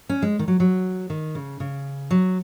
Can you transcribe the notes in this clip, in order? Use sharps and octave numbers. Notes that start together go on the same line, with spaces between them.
C#4
G#3
D#3
F#3
F#3
D#3
C#3
C#3
F#3